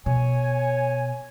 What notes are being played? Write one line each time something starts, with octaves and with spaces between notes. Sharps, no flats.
B2 C#5 G#5